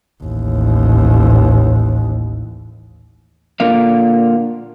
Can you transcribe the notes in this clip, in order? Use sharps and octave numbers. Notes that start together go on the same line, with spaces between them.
A1 D#2
A#2 D3 A#3 F5